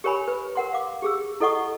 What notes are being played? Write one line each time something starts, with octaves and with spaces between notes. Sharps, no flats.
G4 A#4 C#5 G#5 B5
B4
A#4 F#5 C6
F5 D6
G4 G#4 E6
E4 A4 D#5 F#5 C#6 D#6